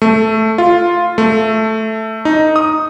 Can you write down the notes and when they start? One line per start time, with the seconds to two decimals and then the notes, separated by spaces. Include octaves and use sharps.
0.02 A3
0.58 F4
1.18 A3
2.25 D#4
2.56 D#6